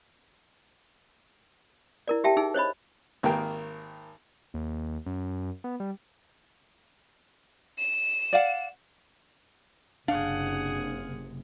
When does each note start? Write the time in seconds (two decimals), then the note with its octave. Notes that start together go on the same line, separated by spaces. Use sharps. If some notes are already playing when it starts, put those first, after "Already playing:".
2.08 E4 A#4 D5
2.24 G4 E5 G5 A5
2.37 D#4 G#4 E6
2.54 C5 C#5 D#5 B5
3.23 G#1 D#3 A#3 G4 A#4 G5
4.54 D#2
5.06 F#2
5.64 B3
5.80 G3
7.78 E7
8.33 D5 F5 F#5
10.08 F#1 C3 D4 G#4 F5 F#5